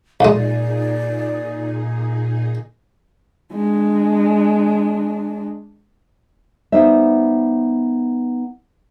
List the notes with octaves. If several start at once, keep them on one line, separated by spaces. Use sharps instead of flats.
B1 A#2 G#3 D#4 G#4 D5
G#3 D4
G3 B3 D#4 C5 E5